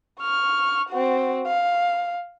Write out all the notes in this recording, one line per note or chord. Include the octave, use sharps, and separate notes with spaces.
C#6 F6
C4 F#4
F5